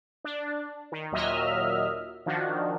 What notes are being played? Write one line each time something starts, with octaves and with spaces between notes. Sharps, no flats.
D4
D#3
D#2 A#2 F#3 D#5 E5 F6
D#3 F3 D4 F#4